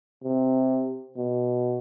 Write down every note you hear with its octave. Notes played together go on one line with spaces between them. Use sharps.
C3
B2